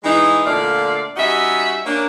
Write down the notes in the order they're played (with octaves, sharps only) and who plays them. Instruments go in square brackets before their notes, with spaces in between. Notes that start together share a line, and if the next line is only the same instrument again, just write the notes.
[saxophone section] E3 G#3 D#4
A#2 D3 A3 F4 D5 F5
G3 C#4 D#4 F#4 E5
A#3 C#4 D4